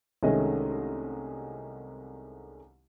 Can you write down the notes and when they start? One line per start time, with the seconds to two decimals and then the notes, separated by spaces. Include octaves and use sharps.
0.23 C2 D#3 G#3 A3 C#4 D#5